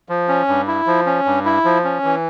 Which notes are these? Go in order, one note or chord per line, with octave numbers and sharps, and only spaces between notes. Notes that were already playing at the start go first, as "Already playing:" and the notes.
F3
C#4
G2
E4
F3
C#4
G2
E4
F3
C#4
E3